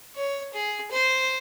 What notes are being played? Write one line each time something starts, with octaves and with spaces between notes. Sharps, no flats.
C#5
G#4
C5